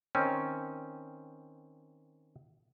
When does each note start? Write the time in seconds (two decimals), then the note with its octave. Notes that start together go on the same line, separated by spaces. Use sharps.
0.15 D#3 C4 C#4